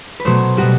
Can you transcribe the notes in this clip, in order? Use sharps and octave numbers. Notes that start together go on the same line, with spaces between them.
B4
B2 F#3 A3 C5
B2 G3 F#4